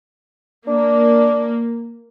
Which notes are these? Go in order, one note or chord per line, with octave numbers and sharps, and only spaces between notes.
A#3 D4